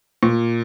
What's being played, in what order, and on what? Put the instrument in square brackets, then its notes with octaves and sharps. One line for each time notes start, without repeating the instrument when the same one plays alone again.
[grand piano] A#2